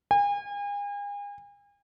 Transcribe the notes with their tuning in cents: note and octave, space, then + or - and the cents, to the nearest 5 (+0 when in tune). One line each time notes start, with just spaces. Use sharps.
G#5 -40